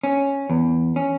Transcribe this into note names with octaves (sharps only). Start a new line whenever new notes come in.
C#4
E2
C#4